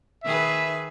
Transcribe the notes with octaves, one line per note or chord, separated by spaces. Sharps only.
D#3 G#4 B4 E5